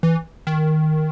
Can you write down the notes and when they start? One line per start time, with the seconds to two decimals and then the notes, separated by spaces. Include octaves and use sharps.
0.03 E3
0.47 D#3